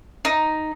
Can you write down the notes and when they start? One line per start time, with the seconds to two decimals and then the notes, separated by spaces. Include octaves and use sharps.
0.25 D#4